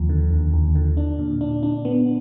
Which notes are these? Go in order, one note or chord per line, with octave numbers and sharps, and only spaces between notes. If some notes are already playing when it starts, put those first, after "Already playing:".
Already playing: D#2 F3
D3
D#2
D#2
D3
D4
A#2
D4
D4
B3